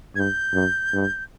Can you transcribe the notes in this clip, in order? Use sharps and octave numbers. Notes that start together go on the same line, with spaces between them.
G2 G6 G#6
F#2
G2